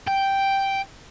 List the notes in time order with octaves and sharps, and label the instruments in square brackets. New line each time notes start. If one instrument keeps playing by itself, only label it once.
[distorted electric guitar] G5